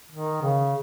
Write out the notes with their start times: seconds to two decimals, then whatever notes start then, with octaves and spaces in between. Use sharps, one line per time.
0.12 D#3
0.42 C#3